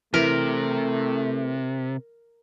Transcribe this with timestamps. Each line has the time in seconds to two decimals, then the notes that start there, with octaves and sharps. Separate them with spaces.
0.14 C3 E3 A3 A#4